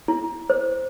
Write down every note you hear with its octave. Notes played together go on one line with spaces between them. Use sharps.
E4
C5